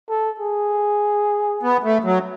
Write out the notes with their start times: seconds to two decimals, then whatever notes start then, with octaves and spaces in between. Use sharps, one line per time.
0.09 A4
0.40 G#4
1.63 B3
1.84 A3
2.04 F#3